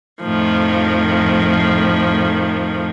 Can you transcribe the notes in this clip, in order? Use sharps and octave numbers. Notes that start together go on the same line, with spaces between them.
F2 A2 D#3 F3